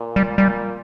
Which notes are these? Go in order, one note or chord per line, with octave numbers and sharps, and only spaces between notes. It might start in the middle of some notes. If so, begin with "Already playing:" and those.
Already playing: A#2
G3
A#2 G3